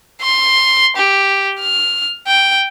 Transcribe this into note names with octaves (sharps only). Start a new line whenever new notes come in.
C6
G4
F6
G5